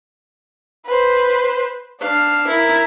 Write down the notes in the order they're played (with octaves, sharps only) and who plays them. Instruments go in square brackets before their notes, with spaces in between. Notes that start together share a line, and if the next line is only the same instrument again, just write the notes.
[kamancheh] B4 C5
[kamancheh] D4 [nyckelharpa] F5
[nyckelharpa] E4 [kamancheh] A#4